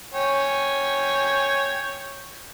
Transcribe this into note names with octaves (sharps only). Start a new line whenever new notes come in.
C#5 G5 G#5